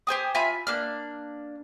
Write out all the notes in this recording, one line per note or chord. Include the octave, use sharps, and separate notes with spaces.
G4 C5 G#5 D#6
F4 E5 G#5 B5
A#3 D4 F6